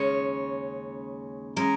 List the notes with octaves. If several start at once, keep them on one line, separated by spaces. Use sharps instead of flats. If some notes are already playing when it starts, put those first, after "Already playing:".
Already playing: D#2 C#3 G#3 C#4 C#5
E3 G#3 C#4 A#4